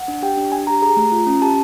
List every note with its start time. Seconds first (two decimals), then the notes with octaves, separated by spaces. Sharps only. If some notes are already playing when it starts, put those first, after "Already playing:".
Already playing: F#5
0.08 D4
0.23 G4 G5
0.37 D4
0.52 D4 G#5
0.67 G4 A#5
0.82 G#4 A#5
0.97 A3
1.12 F4
1.27 C#4
1.42 G4 A5